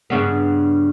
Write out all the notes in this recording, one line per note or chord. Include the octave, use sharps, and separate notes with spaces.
G2 C#3 B3